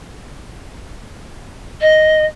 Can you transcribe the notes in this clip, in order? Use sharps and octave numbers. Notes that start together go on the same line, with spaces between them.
D#5